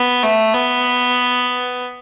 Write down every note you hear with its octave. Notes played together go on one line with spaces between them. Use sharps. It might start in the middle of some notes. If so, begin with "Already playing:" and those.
Already playing: B3
A3
B3